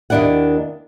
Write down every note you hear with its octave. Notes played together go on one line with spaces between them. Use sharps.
D#2 D#3 G#3 D4 E4 F#5